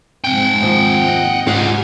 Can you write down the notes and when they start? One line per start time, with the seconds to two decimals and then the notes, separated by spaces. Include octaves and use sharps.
0.24 G#2 C4 F#5 G5
0.61 D#2 F3
1.02 D#5
1.47 G#2 G3 F4 G4 G#4 F#5 G#5